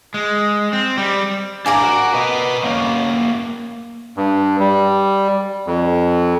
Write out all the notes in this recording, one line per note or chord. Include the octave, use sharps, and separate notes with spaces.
G#3
C4
G3
D4 A#4 D5 F5 G#5
F#4
B4 D#5
A#3 C#4
G2
G3
F2